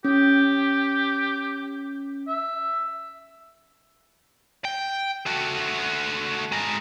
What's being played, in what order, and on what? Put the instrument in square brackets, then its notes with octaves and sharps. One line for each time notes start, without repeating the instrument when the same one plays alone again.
[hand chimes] C#4 [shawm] G4
[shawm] E5
[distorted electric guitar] G5
A3 F#4
G#3 A#4